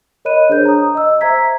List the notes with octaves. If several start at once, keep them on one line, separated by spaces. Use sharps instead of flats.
A#4 C#5 D#5 B5 F#6 D#7
D4 G#4 C5 C#5 G6
A#5 D#6
D#5 E6
C5 E5 A#5 G#6 B6